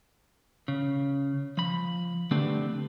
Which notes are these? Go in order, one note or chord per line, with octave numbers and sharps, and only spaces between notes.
C#3
F3 B5
D3 A3 C4 D4 G4 B4